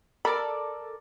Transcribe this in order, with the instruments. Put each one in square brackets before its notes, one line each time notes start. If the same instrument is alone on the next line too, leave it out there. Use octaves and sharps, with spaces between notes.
[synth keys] A4 A#4 D5 [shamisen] B5